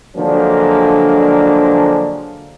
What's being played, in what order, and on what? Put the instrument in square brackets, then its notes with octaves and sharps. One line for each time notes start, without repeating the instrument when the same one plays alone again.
[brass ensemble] D3 F3 F#3 G#3 A#3 D4